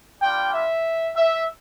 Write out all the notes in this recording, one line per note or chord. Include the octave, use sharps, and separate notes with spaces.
G3 A#3 D4 F4 G5
E5
E5